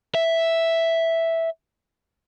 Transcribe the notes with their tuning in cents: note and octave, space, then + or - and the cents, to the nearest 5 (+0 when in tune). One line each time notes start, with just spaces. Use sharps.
E5 +0